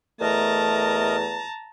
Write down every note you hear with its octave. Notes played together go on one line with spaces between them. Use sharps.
E2 A3 A#4 D#5 A5 A#5